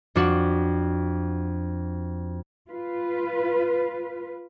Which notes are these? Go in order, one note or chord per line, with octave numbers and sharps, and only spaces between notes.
F2 D4 F#4 F#5
F4 B4